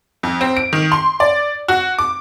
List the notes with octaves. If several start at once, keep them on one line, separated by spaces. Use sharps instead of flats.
F2
C4
D7
D#3
C6
D5
F#4
D6